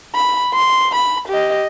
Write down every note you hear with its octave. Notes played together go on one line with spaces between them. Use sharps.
B5
C6
B5
G4 D#5